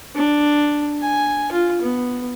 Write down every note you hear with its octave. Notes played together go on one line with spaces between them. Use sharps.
D4
G#5
F4
B3